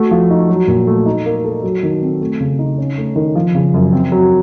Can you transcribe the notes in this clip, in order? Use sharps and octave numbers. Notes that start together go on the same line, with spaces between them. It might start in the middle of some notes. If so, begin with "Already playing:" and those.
Already playing: A3 F#4
F3
D#4
F#3
A#2
A3
D#4
A#3
A4
F#3
D#3
C4
A3
C#3
D#4
C#4
A3
D#3
F3
C#3
F#2
C4
F#3